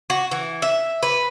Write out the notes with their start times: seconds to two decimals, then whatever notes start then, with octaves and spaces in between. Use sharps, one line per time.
0.10 F#4
0.31 E3
0.62 E5
1.03 B4